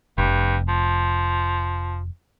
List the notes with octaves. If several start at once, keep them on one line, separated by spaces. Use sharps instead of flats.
F1 G2
F3